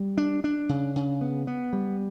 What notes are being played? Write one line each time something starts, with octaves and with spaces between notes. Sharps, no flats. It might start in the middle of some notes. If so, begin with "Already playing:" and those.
Already playing: G3
D4
D4
C#3
C#3
B3
B3
G3